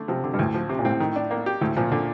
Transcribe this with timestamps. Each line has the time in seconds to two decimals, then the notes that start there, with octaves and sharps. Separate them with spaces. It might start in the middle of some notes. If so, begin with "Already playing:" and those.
Already playing: D3 A3
0.08 C3 F3
0.24 D3
0.34 G2
0.39 D2 A2
0.54 F3
0.69 C3
0.79 A#2
0.85 A2 C4
1.00 D#3
1.16 D4
1.31 A#3
1.46 G4
1.61 D2 A2
1.76 A#2 F3
1.91 A#2 D3